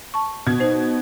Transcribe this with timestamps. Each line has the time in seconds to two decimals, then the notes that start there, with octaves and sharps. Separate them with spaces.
0.14 A5 C#6
0.47 B2 G#6
0.60 D#4 C5